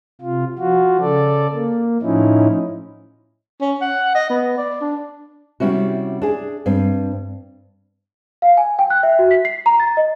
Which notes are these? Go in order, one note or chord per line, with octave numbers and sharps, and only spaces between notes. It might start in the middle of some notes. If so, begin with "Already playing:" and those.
C3 F4
F3 F4 F#4
C#3 A4 D5
A#3
A2 F3 C#4 D#4 E4
C#4
F#5
D#5
B3
D5
D4
C3 G3 C#4 E4 F#4
D4 G#4
G2 C4
F5
G#5
G5
F#6
E5
F#4
B6
C7
A#5
A6
D#5